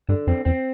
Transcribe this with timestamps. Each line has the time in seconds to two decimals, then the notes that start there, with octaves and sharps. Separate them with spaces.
0.09 G2 D3
0.27 F2 C4
0.45 E2 C4